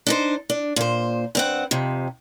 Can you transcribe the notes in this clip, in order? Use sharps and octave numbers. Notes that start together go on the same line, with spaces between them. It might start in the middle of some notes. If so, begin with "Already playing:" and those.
D4 D#4 C5
D4
A#2 C5
G2 C4 F#5
F2 C3